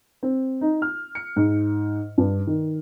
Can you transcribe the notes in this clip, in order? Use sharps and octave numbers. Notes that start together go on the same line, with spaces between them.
C4
D#4
F6
C#7
G#2
G2
D#3